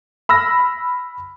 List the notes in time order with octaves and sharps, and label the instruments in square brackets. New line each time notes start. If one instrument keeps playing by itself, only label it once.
[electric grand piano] B5 E6 F6 A#6